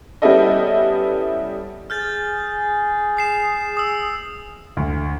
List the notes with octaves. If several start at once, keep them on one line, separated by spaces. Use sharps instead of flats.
G3 B3 C#4 E4 A4 D#5
G#4 F6 G6 A6
D#6 C7 E7
D#6 E6
D2